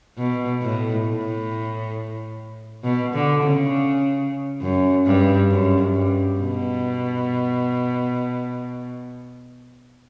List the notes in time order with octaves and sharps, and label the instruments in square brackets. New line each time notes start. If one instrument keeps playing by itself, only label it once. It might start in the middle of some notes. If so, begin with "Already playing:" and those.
[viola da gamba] B2
A2
A2
B2
D3
C#3
F#2
G2
F#2
G2
B2